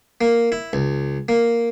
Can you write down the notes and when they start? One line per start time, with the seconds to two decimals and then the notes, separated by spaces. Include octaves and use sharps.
0.21 A#3
0.52 E4
0.73 C#2
1.29 A#3